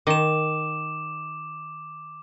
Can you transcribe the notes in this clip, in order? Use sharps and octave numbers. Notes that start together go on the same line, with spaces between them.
D#3 D#5 D6 E7